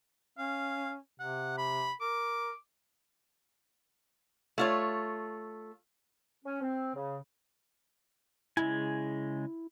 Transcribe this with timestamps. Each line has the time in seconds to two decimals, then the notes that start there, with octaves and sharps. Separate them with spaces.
0.38 C#4 F5
1.20 C3 F#5
1.58 B5
2.01 A#4 D6
4.58 A3 F4 C#5
6.44 C#4
6.61 C4
6.95 C#3
8.57 C#3 G#3 E4 G#5